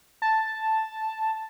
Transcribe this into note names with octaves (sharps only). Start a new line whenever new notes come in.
A5